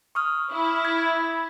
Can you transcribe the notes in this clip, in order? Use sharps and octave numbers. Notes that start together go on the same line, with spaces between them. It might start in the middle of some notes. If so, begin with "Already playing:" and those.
C#6 D#6 F6
E4
G#6